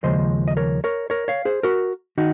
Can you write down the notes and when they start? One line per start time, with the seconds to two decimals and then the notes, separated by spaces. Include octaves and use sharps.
0.03 D#2 C#3 F3 G#3 C5 D#5
0.48 D#5
0.57 A#4 C#5
0.84 A#4 C#5
1.10 A#4 C#5
1.28 C#5 F5
1.45 G#4 C5
1.63 F#4 A#4
2.18 D#3 D#4 F#4